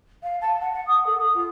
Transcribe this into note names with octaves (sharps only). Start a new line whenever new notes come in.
F5
A5
F#5
F#5
D#6
A4
D#6
F4